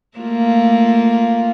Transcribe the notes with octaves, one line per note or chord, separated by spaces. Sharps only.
A3 A#3 F4